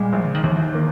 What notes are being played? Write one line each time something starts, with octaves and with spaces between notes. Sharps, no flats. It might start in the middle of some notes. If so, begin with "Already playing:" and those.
Already playing: A#2 G3 G#3
A#1
C#3
D#3
D#2 E3
E3
D#3
A#3